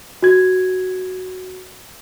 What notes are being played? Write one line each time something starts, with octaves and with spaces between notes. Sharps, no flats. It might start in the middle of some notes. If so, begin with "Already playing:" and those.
F#4 G#6